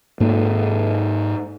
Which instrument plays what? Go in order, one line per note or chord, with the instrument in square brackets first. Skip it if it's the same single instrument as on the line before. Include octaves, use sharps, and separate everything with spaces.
[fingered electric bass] G#2 A#3